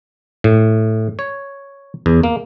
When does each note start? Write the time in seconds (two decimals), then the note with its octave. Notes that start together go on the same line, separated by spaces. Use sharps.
0.44 A2
1.19 C#5
2.06 E2
2.23 A#3